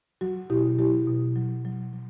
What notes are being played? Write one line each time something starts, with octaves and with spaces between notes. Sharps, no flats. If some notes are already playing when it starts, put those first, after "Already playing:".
F#3 F#4
B2 E4 G4
F#3 E4 G4
B2
F#3
F#3
F#3